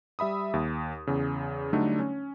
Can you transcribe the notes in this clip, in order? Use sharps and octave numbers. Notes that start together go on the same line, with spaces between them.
G3 E5 B5 D#6
D#2
E2 C#3
D3 F#3 G3 A3 D4 D#4
C#4